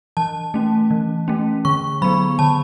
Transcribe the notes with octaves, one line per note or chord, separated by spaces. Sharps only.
E3 A5
A3 C#4
E3
A3 C#4
D3 C#6
F#3 B3 B5
D3 A5